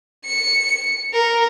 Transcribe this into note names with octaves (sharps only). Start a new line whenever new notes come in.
C#7
A#4